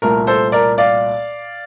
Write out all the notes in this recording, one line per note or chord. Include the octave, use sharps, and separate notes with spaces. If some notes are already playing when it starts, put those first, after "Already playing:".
C2 A#2 A3 A#4
A4 C5
A#4 D5
D5 F5